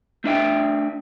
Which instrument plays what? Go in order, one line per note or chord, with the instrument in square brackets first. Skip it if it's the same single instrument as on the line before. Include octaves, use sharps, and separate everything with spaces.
[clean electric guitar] A3 D4 E5 G5